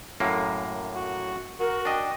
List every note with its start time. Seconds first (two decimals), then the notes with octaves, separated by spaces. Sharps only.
0.20 F#2 A2 A#3
0.95 F#4
1.60 F#4 A#4
1.85 D4 D#5 G5